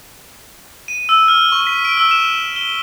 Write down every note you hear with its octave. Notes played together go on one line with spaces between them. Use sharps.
D#7
E6
F6
C#6
B6
D7
E6
E7
G7